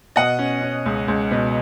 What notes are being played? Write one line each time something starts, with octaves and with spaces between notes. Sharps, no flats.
B2 D#5 F#5
C#4
C#4
C#2
C#2
B2